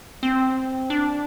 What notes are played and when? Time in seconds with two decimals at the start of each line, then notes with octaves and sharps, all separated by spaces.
0.23 C4
0.90 D4